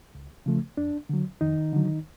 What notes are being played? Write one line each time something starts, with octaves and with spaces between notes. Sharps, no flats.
C#2
C#3 F3 A3
F2 D4
D3 F#3
F2 D#3 D#4
D3 F#3